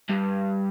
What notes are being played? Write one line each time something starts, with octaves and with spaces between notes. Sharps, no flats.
G2